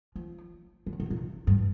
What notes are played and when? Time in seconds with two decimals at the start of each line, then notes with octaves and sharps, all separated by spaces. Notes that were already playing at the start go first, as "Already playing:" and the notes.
0.16 F3
0.86 D3
1.00 C3
1.10 A#2
1.47 G2